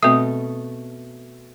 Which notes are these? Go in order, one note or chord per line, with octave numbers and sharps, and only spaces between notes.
B2 A3 C4 E5 D#6